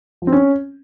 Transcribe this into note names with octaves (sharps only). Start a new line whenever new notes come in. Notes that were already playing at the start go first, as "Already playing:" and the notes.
F3
C4
C#4